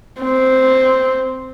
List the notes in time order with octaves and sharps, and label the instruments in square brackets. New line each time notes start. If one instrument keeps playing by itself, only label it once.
[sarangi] C4